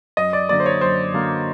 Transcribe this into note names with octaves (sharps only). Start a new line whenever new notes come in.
F#2 D#5
D5
D3 F#3 A#3 D5
C5
C#5
F#2 C5
D3 F#3 A#3